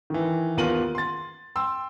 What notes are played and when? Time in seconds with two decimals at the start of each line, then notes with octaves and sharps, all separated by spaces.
0.10 D#3 E3
0.57 D#2 B3 F4 A#4 D#7 F#7
0.95 C6 A6
1.56 G5 C6 E6